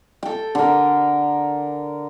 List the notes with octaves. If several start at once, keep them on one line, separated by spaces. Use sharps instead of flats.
A4 G5
D3 A#4